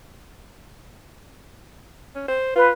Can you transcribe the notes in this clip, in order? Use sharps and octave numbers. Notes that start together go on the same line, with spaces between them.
C#4
C5
F4 B4